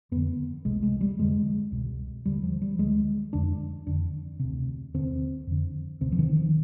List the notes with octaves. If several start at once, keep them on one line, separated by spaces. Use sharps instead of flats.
F2 D3 B3
C2 C3 G#3
G#3
G3
F2 D3 G#3
C2 B2
D#2 D3 G3
F3
G3
D2 D3 G#3
F2 D3 D4
F2 D3 D4
D2 C3
D#2 D3 C4
F2 D3
D2 C3 C4
F3
D#3
D#3